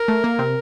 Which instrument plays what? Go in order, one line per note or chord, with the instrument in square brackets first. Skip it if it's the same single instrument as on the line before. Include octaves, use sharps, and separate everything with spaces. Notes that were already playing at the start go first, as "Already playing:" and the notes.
Already playing: [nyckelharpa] A#4
[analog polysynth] A3
A#3
C3 C4